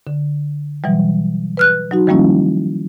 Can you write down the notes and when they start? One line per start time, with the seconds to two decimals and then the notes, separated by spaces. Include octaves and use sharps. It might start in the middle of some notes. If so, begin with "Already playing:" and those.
0.07 D3
0.84 B2 E3 F#3 G3
1.57 B4 F6 F#6
1.91 F#3 D#4 F#4
2.07 D#3 F3 G3 A#3 C#4 E4